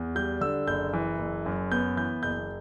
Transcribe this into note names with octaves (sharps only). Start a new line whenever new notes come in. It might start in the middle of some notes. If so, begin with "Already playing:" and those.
Already playing: E2
G3 G6
D3 E6
F#1 G6
E3
F#1
F#2
B3 G6
E3 G6
F#1 G6